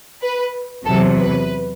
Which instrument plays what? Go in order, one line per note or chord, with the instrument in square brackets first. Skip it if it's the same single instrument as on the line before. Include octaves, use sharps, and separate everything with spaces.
[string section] B4
E2 C3 F#3 A4
B4